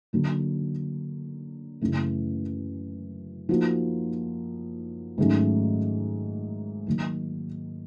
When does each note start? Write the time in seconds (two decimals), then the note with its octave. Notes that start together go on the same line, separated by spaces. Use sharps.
0.13 D3 F#3 A#3
1.81 F#2 C#3 E3 A3
3.49 F3 A#3 D#4 F#4
5.18 G#2 D#3 F#3 A3 C#4
6.87 D#3 F#3 A#3